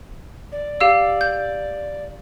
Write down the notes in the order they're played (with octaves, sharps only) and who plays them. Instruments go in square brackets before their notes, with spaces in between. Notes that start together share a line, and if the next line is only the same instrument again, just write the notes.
[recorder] D5
[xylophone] G4 F5 E6
G6